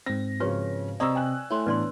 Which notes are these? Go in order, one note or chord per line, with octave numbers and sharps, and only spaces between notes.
G#2 C4 A#6
C#3 F3 C#4 F#4 B4 C#5
C3 C4 D5 D#5 A#5 C#6 D#6 E6
G5 G#5 F#6
A3 E4 C#5 C6
A2 E3 B3 D4 B4 D5 C6